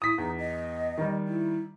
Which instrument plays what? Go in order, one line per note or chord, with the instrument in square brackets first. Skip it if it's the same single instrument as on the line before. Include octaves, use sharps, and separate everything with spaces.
[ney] E4 [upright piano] D#6 B6
[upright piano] E2 [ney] D#4
[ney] D#5
[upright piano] D#3 G3
[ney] E4